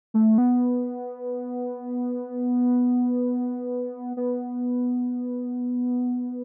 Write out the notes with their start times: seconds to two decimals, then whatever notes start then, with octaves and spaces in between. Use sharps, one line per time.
0.14 A3
0.38 B3
4.17 B3